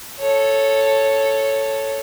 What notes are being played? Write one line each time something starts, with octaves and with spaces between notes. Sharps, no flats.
A4 C#5